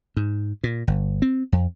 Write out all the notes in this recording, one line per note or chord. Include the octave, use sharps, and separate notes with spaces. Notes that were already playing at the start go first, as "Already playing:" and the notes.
G#2
A#2
G1
C4
F2